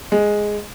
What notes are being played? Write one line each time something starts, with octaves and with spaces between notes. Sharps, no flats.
G#3